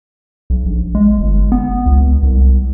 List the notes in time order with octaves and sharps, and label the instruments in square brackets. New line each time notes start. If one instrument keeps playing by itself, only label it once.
[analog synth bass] B1
A#1
G#3
G1
B3
C#2
C2